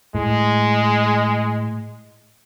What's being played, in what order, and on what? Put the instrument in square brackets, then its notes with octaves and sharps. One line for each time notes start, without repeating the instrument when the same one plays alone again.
[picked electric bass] A2 [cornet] G#3